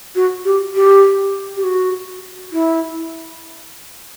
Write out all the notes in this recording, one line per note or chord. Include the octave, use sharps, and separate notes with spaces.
F#4
G4
G4
G4
F#4
E4